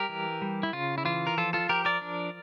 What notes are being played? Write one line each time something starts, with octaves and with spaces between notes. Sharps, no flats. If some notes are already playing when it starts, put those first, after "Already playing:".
Already playing: G3 G4 A#4
E3
G3
E4
C#3 F4
E4
E3 F4
A#4
F3 F4 A4
F4 A4
F3 G4 A#4
A#4 D5
D4